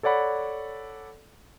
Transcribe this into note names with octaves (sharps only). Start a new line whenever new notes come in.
A4 C#5 D5 F#5 B5